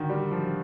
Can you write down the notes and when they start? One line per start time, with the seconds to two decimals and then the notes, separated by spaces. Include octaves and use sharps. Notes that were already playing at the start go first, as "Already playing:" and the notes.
Already playing: D3 D#3
0.10 G3
0.31 F3